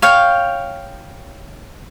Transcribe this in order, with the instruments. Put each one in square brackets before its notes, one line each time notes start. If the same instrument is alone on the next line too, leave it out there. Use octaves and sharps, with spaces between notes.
[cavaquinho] C#5 F5 G5